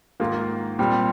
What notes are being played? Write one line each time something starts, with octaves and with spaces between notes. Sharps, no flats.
G#2 D#3 A#3 F4
A#2 G3 C4 G4